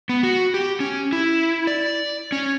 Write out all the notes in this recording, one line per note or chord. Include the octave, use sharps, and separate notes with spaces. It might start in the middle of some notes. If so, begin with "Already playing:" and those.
B3
F#4
G4
C#4
E4
D5
C#4